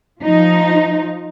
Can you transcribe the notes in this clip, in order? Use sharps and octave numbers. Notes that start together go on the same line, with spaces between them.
F3 D#4